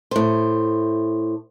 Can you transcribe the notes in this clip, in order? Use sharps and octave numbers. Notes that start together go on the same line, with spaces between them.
A2 C5